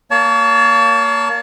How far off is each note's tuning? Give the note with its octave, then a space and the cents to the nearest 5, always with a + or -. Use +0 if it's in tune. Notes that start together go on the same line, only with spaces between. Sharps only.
A#3 +0 C#5 +40 A5 +0